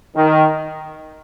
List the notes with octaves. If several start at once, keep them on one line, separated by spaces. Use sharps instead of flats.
D#3